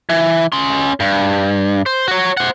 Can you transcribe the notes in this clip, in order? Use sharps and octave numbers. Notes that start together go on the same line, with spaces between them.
E3
C#4 C6
G2
C5
F#4 C#5
C5 F#5